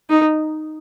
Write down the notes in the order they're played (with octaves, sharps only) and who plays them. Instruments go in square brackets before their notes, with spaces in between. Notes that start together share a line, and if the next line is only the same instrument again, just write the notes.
[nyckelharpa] D#4